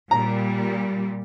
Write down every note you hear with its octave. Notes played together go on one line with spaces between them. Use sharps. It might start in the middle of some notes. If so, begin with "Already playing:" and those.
A#2 G3 A#5